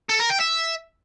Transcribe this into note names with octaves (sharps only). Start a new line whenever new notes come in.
A4
A#4
G5
E5